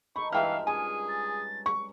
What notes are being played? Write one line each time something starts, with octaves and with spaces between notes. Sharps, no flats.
D#4 A4 A#4 B5 C#6
G2 E3 G#3 F4 E5 F5 G5 F6
C#4 G#4 G#5 D#7
A6
C#6